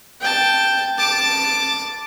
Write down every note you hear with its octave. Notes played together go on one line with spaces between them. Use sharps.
G5 A5
A5 D6